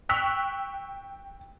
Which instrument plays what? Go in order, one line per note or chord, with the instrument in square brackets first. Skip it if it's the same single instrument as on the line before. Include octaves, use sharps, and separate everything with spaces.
[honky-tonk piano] G5 C#6 E6 F#6 B6 F7